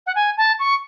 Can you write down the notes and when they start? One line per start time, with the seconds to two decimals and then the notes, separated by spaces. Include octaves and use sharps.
0.06 F#5
0.15 G#5
0.37 A5
0.58 C#6